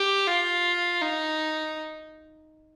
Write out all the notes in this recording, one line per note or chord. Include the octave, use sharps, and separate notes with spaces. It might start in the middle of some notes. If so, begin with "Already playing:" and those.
Already playing: G4
F4
D#4